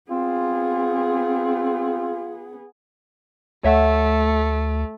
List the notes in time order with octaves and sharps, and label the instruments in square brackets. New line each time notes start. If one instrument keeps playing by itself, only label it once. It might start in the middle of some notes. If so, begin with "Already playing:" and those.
[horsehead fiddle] B3 G#4 [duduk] C4 [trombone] F4
[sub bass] D2 [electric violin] A3 [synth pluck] C#5 E5 F#5